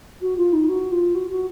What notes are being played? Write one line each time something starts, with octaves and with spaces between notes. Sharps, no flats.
F#4
F4
D#4
F#4
F4
F#4
F#4